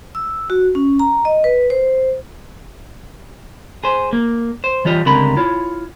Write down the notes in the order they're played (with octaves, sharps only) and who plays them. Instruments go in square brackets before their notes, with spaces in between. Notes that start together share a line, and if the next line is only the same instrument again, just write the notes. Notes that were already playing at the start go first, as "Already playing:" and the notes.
[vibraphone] E6
F#4
C#4
A#5
D#5
B4
C5
[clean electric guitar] G#4 C5
A#3
C5
E3 G3 F4 C#5 D#5
C#2 D3 G3 C4 A#4 B5
E4 F4 C#5